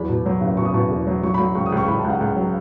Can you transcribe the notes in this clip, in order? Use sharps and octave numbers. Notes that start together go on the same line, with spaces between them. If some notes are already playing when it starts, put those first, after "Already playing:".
Already playing: E2 F#3 B5
B2
F#3
F#1
B2 C#6
D#6
B2 C#6
E2
F#3
F#3 C#6
F#3 B5
C#2 C#6
D#6
C#2
C#6
C#2 B5
A5
C#2 F#5
C#2 F#5
F#3